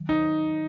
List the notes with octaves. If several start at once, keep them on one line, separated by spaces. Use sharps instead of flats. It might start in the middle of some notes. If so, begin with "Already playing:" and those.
Already playing: D#3 F#3
D#4